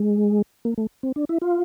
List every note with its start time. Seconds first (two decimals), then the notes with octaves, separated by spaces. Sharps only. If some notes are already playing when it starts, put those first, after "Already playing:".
Already playing: G#3
0.65 A#3
0.78 A3
1.03 C4
1.16 D4
1.29 E4
1.42 F4